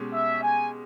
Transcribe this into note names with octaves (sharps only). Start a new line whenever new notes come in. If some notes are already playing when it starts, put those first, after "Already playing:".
Already playing: B2 G#3 C#4 G4
E5
G#5